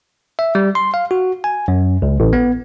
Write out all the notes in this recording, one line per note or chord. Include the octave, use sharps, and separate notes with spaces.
E5
G3
C6
F5
F#4
G#5
F#2
C#2
A1
B3